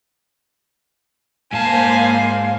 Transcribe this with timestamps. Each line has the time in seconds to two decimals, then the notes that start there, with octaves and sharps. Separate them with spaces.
1.53 G#2 A#3 C5 F5 G#5 A5